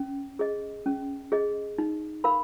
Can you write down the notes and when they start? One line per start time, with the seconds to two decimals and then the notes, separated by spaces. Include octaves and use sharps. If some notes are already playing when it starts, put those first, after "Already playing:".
Already playing: C#4
0.39 G#4 D#5
0.86 C#4
1.32 G#4 D#5
1.78 D#4
2.24 A#4 F5 B5